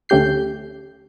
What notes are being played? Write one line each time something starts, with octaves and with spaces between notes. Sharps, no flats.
D2 A3 C#4 G4 G6 C7